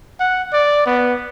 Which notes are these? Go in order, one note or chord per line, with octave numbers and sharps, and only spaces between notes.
F#5
D5
B3